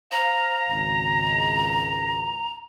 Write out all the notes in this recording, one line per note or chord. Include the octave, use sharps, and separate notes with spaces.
C5 F5 A#5 A#6
G#1 C#2